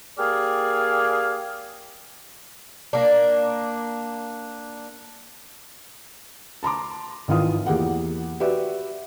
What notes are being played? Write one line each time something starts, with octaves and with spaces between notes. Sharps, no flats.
A#3 G4 G#4 D5 F5 F6
A#3 D4
A5 A#5 C6 D6
G#1 D#3 E3 F4 F5 D#6
E2 A#3 G4 G#4 F#5
F#4 G4 B4 D5 E5